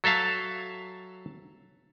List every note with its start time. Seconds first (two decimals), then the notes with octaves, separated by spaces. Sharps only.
0.04 F#3 A4 E5 F5 A5